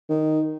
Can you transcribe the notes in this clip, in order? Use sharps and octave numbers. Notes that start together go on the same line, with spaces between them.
D#3